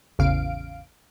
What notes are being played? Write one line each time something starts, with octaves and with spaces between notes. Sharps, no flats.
A1 E2 C#3 F5 D7